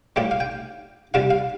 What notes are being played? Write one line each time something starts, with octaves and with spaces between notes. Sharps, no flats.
A2 G3 F4 G4
F5
G5
C3 G3 F4 F5
F5